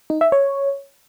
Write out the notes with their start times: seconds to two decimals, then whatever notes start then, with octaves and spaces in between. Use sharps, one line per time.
0.10 D#4
0.21 E5
0.32 C#5